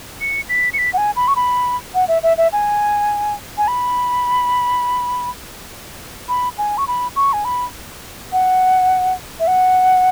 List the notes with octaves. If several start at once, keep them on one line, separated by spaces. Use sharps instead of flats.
C#7
B6
C#7
B6
F#5
G#5
B5
C#6
B5
F#5
E5
E5
E5
G#5
G#5
B5
B5
G#5
C#6
B5
C#6
G#5
B5
F#5
E5
F#5